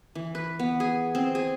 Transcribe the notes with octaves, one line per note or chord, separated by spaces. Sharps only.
E3
B4
B3
G#4
C4
G#4